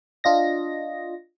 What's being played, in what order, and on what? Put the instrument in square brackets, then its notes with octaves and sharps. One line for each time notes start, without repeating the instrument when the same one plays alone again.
[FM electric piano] D4 F4 D#5 A#6